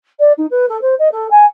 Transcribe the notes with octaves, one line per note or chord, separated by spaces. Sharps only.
D5
D#4
B4
A4
C5
D#5
A4
G#5